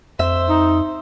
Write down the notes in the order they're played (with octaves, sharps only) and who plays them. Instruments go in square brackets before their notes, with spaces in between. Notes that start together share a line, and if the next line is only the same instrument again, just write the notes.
[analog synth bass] F2 [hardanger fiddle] C5 [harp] E5
[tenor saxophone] D#4